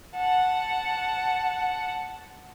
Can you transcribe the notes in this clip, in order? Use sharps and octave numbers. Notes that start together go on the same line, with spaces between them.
F#5 A5